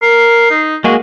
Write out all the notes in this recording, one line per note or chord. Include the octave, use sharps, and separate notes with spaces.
A#4 C7
D#4
G#3 A#3 F#4 G#4